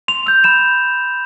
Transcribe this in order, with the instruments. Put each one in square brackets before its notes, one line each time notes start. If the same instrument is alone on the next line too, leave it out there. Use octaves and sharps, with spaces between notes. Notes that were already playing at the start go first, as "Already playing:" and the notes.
[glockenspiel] C6 F7
E6 G6 F7
B5 E7